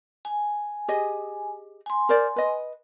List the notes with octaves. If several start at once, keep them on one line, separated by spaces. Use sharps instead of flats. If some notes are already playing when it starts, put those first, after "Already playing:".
G#5
G4 G#4 D#5
G#5 C6
A#4 C5 D5
B4 D#5